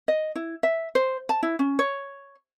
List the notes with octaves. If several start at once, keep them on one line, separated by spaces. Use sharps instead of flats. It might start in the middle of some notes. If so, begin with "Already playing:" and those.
D#5
E4
E5
C5
A5
E4
C#4
C#5